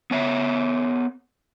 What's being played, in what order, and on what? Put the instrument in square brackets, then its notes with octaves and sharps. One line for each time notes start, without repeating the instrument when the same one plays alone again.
[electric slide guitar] B3 C#5 E5